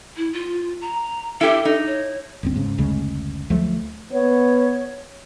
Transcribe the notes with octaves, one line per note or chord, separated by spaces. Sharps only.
E4
F4
A#5
E4 G4 A4
D#4
C#5
G1 D2 C4
G#2 C#3
F#1 D2 C#3 G#3
D2 F3 F#3 A3
B3 C#5